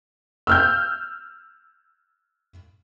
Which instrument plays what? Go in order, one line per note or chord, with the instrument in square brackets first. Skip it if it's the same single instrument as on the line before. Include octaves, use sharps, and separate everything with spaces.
[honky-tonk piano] E6 F6 G6